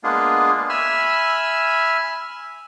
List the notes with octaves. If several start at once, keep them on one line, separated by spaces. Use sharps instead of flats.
G#3 A#3 B3 D4 F4 G#4
E5 G#5 B5 E6 F6